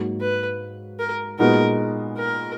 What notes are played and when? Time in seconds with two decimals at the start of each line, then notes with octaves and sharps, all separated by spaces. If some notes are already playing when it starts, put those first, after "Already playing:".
Already playing: G#2 F#3 A#3 D#4 F#4
0.21 B4
1.00 A#4
1.39 A#2 G#3 B3 D#4 F#4 A#4
2.18 A#4